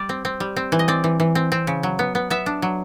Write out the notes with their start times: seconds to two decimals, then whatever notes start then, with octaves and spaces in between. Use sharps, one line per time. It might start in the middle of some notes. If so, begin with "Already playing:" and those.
Already playing: G3 D5
0.09 C4
0.25 C4
0.40 G3
0.56 C4
0.72 E3
0.79 D#5
0.88 C4 D5
1.04 E3
1.20 E3
1.35 C4
1.52 C4
1.67 C#3
1.83 F#3
1.99 B3
2.15 B3
2.30 B3 E5
2.46 D4
2.62 F#3